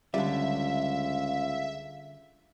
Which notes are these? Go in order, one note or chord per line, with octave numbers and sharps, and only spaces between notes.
C#2 D3 G3 E5 F5